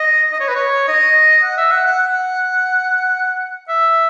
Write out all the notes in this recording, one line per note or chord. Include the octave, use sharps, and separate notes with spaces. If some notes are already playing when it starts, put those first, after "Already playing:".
Already playing: D#5
D#5
C#5
B4
C#5
D#5
F#5
E5
F#5
F#5
F#5
E5